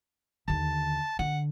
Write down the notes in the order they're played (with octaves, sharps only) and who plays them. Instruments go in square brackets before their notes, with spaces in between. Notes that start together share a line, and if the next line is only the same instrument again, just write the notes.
[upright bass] D#2 D3 [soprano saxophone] A5
[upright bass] D3 [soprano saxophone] F#5